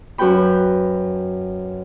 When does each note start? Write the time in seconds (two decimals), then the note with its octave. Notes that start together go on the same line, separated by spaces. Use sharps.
0.18 F#2 F#4 B4 G5 B5